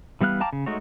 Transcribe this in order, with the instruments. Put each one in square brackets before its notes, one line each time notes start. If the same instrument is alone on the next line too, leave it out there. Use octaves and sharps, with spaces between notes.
[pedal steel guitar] E3 G3 B3 F5 F#6
F5 G5 A5 A#5 D6
C#3
G#3 A3 D#4 F#4 C#5